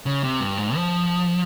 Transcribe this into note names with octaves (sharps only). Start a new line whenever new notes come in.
C#3
C3
G2
G#2
F3